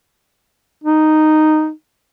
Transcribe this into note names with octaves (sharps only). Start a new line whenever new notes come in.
D#4